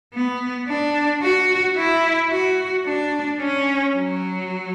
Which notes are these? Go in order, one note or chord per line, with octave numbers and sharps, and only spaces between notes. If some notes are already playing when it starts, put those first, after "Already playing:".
B3
D4
F#4
E4
F#4
D4
C#4
F#3